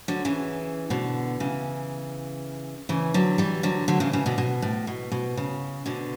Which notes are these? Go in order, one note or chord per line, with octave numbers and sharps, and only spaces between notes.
D3 F#3
C#3 E3
B2 D3
C#3 E3
C#3 E3
D3 F#3
E3 G3
D3 F#3
D3 F#3
C#3 E3
C#3 E3
B2 D3
B2
A2
B2
B2
C#3
B2 D3